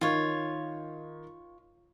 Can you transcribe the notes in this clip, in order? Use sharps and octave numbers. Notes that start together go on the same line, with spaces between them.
D#3 F4 C#5